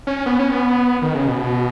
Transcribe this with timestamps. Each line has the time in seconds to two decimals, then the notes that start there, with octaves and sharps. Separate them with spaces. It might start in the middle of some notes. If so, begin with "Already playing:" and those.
0.07 C#4
0.26 B3
0.39 C#4
0.51 B3
1.02 D#3
1.15 C#3
1.27 B2